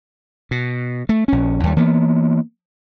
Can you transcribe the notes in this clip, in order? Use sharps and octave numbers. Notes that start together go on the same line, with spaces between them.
B2
A3
A#1 C#4
D#2 G3
E3 A#3 B3